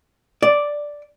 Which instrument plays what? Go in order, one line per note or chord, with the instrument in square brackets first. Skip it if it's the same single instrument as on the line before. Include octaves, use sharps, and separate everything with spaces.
[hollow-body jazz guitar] D5